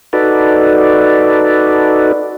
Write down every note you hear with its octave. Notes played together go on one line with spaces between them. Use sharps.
D#4 F#4 A4 B4 D5